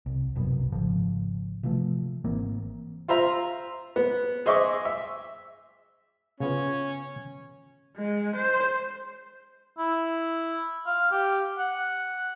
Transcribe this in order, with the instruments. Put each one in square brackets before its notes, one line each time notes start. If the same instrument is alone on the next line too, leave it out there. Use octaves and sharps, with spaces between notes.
[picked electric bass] C2
F#1 C2 F#2 B2
G#1 C#3 F3
C3 E3 F3 A3
G#1 E3 A#3 C4
[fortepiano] F4 C5 E5 A#5
B3
G#4 C5 D#5 E5 C#6 D6
E5
[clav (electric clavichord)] C#3 B3 F4 [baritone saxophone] C#4
[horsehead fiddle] G#3
C5
[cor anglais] E4
F5
G4
F#5